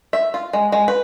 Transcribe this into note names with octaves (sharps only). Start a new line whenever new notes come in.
E5
F4
G#3
G#3
B4